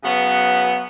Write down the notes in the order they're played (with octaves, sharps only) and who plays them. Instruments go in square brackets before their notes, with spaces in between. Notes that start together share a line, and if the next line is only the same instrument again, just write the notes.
[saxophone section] C#3 F#3 B3